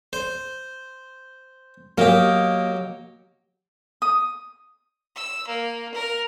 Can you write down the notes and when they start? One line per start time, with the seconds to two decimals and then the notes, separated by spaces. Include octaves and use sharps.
0.13 C5
1.98 F#3 A#3 G4 D#5
4.02 D#6
5.16 E6
5.48 A#3
5.94 A#4